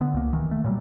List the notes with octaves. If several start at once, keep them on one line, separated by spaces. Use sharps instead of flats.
D3 B3
C#2 A#3
E1 D#3 E3
A3
A#2 F#3 G3